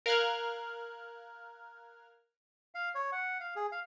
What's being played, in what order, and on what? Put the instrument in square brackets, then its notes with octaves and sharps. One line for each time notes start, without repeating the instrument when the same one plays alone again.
[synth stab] A#4 F5 F6 F#6 G#6
[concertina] F5
C#5
F#5
F5
G#4
F5